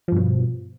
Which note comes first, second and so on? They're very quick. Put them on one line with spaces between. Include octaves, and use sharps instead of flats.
F3 G2 B2